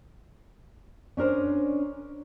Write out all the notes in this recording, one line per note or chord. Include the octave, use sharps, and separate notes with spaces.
C#4 D4 A#4 C5